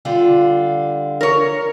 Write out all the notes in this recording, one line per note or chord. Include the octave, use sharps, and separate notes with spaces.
D3 G3 F4
A#4 C#5